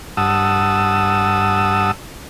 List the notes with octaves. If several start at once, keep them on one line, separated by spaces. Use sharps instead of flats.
G2 F#5 A5 D#6 E6